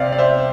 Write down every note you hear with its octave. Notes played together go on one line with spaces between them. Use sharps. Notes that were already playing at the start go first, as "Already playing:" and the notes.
Already playing: C3 D5 F5
D5
C5 E5